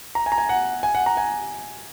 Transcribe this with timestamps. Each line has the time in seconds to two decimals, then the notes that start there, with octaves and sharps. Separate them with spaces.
0.15 A#5
0.26 G#5
0.32 A#5
0.38 G#5
0.49 F#5
0.83 G#5
0.95 F#5
1.06 A#5
1.17 G#5